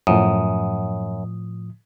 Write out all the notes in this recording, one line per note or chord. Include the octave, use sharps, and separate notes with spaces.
F#2 A2 F3 D#6